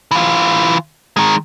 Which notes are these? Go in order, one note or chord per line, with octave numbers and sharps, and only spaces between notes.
E3 F4
D#3 G#3